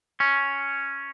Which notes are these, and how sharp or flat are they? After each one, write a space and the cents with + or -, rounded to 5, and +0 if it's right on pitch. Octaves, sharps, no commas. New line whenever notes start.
C#4 +0